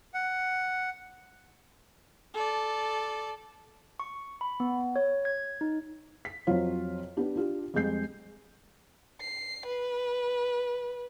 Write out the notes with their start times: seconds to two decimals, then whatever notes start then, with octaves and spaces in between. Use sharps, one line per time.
0.14 F#5
2.34 A4 D5
4.00 C#6
4.41 B5
4.60 B3
4.96 C#5
5.25 G#6
5.61 D#4
6.25 B6
6.47 F2 F#3 F4 C5 C#5 F5
7.17 B3 D4 G4
7.36 D4 F4 G4
7.74 F2 G3 G#3 G6 C7
9.21 C7
9.66 B4